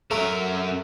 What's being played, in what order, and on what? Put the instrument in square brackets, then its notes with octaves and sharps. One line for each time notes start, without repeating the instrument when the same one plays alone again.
[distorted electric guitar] F#2 A#4 [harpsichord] A3